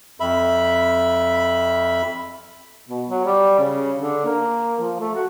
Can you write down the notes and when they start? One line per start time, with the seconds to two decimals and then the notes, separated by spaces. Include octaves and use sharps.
0.20 F2 E5 B5
2.88 B2
3.08 F#3
3.25 G3
3.59 C#3
3.96 D3
4.25 A#3
4.80 F3
4.99 A3
5.15 F#4